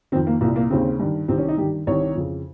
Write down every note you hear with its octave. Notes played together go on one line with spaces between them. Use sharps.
F2 D#3 C4
A#3
C2 A#2 A#3
A#3
D#2 C#3 C4
G2 D#3
C2 C3 D#3 C4
C#4
D#4
G2 D#3 G4
C2 C3 D#3 C#5
F2 C#3